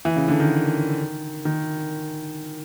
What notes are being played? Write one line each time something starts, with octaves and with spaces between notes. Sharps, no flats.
E3
C#3
D3
D#3
D#3